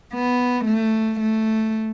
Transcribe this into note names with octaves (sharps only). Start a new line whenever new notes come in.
B3
A3
A3